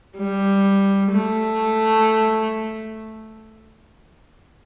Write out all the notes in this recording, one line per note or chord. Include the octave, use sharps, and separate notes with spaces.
G3
A3